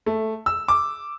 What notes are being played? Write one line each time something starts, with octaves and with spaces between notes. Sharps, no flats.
A3
E6
D6